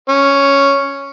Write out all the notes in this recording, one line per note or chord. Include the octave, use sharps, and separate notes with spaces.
C#4